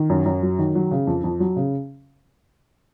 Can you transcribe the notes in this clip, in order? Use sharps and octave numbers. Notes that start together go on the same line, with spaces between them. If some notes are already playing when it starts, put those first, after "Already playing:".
Already playing: D#3
F#2
F#2
F#3
D#3
F#3
C#3
F2
F2
F#3
C#3